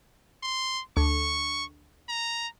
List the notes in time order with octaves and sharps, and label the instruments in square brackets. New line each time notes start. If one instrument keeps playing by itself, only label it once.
[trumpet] C6
[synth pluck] D2 [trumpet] C#6
[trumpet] A#5